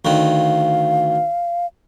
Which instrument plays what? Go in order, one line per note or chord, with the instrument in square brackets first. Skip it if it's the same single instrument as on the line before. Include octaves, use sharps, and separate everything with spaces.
[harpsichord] D2 D#3 [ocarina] F5